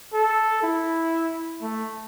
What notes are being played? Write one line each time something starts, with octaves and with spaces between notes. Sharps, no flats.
A4
E4
A3